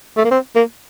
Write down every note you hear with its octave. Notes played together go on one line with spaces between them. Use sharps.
A3
A#3
C4
A#3